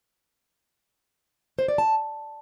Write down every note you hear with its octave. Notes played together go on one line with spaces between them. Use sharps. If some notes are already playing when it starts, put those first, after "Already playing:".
C5
D5
A5